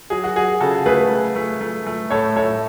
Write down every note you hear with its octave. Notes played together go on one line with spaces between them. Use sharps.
F#3 G#4
F#4
F#3 G#4
C#3 F#4 A4
A3 G#4 B4
A3
A3
A3
A3
A2 A4 C#5
A2 A4 C#5